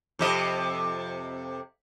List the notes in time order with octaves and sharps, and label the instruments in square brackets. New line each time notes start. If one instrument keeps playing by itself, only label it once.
[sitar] F2 C3 D#5